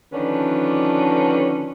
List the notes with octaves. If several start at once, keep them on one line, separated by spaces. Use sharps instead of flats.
D3 D#3 F3 C#4 D4 B4